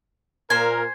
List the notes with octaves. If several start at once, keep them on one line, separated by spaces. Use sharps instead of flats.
A#2 A#4 C5 G#5